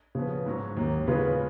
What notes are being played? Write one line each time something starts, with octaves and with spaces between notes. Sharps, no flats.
C#3 F3 B3
G#2 F#3 C#4
D#2 D#3 F#3 A#3
C#3 G#3 B3 F4 B4